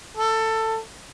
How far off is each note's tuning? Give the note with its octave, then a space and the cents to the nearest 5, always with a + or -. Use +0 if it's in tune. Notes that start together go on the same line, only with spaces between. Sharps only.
A4 +15